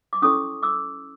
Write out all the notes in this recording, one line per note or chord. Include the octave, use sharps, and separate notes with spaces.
D6
C#4 E4 A4 C#5 C#6 D#6
D6 E6